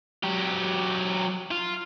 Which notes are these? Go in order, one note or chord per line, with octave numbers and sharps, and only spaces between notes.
F#3 G4
F4